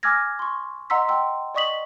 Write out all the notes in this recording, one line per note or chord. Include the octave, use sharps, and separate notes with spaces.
G#5 D6 E6 F6 G#6 A#6
C6 C#6
D#5 F#5 A#5 C6 E6 B6
G5 C6 E6
D5 D#5 C#6 D#6 B6 F#7